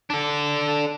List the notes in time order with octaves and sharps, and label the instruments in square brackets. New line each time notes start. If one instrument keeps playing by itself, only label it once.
[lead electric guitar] D4 A4